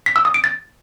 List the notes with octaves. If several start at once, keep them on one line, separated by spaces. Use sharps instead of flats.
B6
E6
D#6
D7
A6